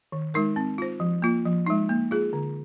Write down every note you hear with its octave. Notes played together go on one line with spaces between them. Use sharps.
D#3
G#3 D#4 A#4
C4
F4 C5
F3
A#3 F4
F3
G#3 D#4
A#3
F4 G#4
D3